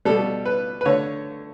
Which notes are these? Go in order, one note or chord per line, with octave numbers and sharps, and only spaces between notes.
B2 G3 A4
B4
B4
D3 A3 C#5